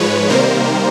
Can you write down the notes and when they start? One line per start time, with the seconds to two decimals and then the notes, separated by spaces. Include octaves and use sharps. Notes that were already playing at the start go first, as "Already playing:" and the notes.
Already playing: G#2 F3 G#3 B4 C#5
0.30 C3 D#3 G3 A#3 A#4 C5